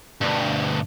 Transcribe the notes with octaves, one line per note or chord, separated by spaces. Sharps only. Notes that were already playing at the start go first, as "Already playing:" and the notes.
D2 G2